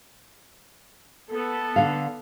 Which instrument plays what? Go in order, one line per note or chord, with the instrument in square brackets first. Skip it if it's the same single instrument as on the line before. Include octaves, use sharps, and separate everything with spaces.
[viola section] B3 A4
[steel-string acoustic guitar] D3 F5